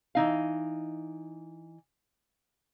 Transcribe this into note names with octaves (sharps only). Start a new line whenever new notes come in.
E3 D#4 F5